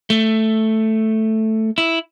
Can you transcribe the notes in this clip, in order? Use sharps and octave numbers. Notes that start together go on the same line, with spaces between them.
A3
E4